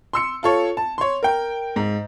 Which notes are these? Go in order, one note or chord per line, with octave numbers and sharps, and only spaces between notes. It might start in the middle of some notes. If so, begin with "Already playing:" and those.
C6 E6 C#7
F4 A4 C#5
A5
C#5 C6
A#4 G5
G#2